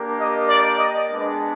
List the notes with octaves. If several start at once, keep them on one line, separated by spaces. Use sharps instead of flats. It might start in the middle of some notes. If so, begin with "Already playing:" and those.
Already playing: A#3 D4 G4
D#5
D5
D#5
G#3 B3 D4